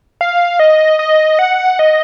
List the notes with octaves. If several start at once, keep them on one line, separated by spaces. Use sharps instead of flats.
F5
D#5
D#5
F#5
D#5